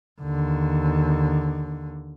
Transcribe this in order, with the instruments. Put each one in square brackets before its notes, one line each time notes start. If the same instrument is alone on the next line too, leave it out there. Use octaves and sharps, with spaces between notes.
[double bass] D#2 D3